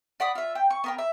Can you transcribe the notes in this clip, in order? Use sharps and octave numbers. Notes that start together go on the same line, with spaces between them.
D5 F#5 B5 D#6
F4 E5
G5
C#6
B3 A#4 G5
E5